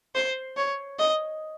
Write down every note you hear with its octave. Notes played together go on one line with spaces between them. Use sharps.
C5
C#5
D#5